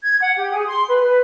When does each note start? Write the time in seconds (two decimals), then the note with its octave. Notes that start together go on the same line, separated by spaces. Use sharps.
0.03 G#6
0.22 F#5
0.37 G4
0.51 G#4
0.67 C6
0.89 B4
1.03 B4